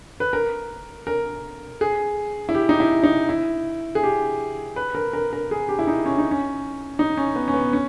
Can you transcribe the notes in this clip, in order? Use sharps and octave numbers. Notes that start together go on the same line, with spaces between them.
B4
A#4
A#4
G#4
E4
G4
D#4
E4
D#4
E4
G#4
G4
B4
A#4
A#4
A#4
G#4
G4
E4
D#4
C#4
D#4
C#4
D#4
C#4
B3
C#4
B3
C#4